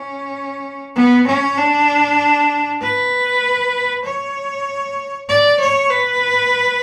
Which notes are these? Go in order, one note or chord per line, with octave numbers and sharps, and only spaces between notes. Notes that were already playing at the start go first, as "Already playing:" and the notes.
Already playing: C#4
B3
C#4
D4
B4
C#5
D5
C#5
B4